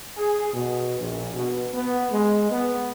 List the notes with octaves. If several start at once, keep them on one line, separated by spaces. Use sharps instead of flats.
G#4
B2
A#1
B2
B3
G#3
B3